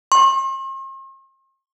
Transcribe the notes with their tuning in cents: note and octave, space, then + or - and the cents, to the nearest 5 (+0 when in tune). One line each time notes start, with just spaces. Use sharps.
C6 +45